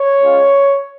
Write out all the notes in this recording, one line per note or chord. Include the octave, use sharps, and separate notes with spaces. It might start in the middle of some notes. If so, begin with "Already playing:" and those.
Already playing: C#5
G#3 C#4 F4